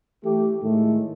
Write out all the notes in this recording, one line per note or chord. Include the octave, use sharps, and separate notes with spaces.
E3 A3 G4
A2 D#3 G#3 A3